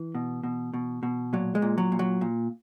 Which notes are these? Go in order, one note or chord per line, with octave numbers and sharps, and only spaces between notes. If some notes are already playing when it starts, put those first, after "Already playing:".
Already playing: E3
B2
B2
B2
B2
A#2 F#3
G#3
A#2
F#3
A#2
F#3
A#2